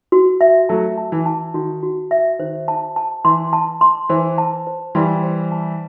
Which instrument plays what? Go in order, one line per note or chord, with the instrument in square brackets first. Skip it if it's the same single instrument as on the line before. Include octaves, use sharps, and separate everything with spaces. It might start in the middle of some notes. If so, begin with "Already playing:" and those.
[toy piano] F#4
E5
[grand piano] F#3 A3 [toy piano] A5
[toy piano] A5
[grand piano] E3
[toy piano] A5
[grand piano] D#3 [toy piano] F#4
[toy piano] F#4
E5
[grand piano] D#3 [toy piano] C5
[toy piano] A5
A5
[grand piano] E3 [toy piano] C6
[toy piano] A5
C6
[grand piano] E3 [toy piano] C5
[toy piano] A5
C5
[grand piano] E3 G3 [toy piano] C6
[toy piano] C5
A5